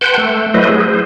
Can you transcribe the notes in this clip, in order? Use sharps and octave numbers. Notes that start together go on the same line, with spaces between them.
B4 F#5 G5 A5 C6 G6
A3
F#3 A3 E4 B4 C5 D#5
G#4
C5